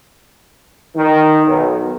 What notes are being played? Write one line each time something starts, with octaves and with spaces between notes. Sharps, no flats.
D#3
B1